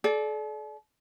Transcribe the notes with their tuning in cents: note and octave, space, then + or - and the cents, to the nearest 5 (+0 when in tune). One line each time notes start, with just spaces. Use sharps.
A4 -45 D5 +0